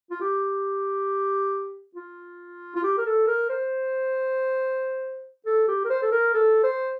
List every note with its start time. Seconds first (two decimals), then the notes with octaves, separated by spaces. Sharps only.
0.11 F4
0.21 G4
1.95 F4
2.76 F4
2.83 G4
2.98 A#4
3.06 A4
3.27 A#4
3.50 C5
5.46 A4
5.68 G4
5.85 A#4
5.90 C5
6.02 A4
6.12 A#4
6.34 A4
6.64 C5